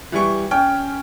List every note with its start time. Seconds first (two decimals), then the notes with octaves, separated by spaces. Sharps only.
0.12 E3 G3 C#6
0.51 C#4 G5